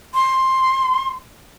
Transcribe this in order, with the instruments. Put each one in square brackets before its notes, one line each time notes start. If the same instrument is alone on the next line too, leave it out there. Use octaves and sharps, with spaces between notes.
[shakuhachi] C6